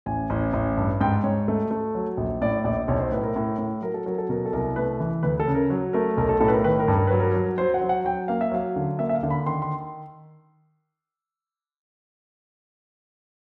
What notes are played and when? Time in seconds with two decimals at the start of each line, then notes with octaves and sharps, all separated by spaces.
0.06 A1 G#5
0.30 A1
0.53 A1
0.77 G2
1.01 G#2 G5
1.24 G#2 C#5
1.48 A3
1.71 A3
1.95 F#3
2.17 A#1
2.42 A2 D5
2.64 A#1 D5
2.88 B1 C#5
3.00 C5
3.12 A2 B4
3.23 A#4
3.36 A2
3.58 A2
3.82 F#3 A#4
3.94 A4
4.06 F#3 A#4
4.18 A4
4.29 B2 A#4
4.46 A4
4.53 C2 A#4
4.76 A3 B4
5.00 E3
5.23 D2 B4
5.40 A4
5.47 C#3
5.55 A#4
5.70 F#3
5.93 A3 A#4
6.17 B1 A#4
6.29 A4
6.40 A2 A4
6.48 B4
6.52 A#4
6.64 D#3 B4
6.80 A#4
6.88 G2
6.95 A#4
7.07 F#3 B4
7.20 A#4
7.34 F#3
7.58 F#3 C5
7.74 F#5
7.81 F#3
7.89 F#5
8.05 F#3 G5
8.28 A#3 F5
8.41 E5
8.52 F#3 F5
8.76 D3
8.99 A#3 E5
9.09 E5
9.15 F5
9.23 D3
9.30 B5
9.46 D#3 C6
9.62 C6